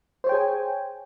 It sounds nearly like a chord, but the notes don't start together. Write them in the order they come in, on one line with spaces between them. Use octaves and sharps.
C5 C#5 G5 G#4 G#5